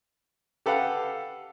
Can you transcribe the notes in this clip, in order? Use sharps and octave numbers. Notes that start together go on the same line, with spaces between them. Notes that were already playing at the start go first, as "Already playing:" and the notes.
G4 A4 B4 F5 F#5